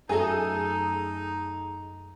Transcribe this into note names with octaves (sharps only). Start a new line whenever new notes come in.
F#2 A3 D#4 G#4 A4 D#5